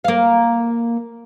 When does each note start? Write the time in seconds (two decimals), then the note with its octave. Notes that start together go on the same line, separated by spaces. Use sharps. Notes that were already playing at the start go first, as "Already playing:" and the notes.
0.04 A#3 F5